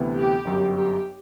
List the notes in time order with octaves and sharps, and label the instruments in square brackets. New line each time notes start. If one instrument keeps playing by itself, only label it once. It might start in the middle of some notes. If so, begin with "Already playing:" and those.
Already playing: [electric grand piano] D2 C3 E3 B3
[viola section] G4
[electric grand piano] G1 F#2 F#3
[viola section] G4